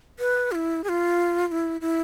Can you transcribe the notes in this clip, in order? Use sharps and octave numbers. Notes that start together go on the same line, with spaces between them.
B4
F4
E4
G#4
F4
F4
E4
E4